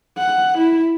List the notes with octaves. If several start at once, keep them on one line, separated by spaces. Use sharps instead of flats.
F#5
E4